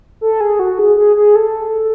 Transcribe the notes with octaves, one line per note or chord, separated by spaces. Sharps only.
A4
G#4
F#4
G#4
G#4
G#4
A4